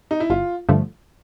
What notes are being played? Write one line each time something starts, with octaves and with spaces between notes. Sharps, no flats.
D#4
E4
G1 F4
G2 D3 F3 A3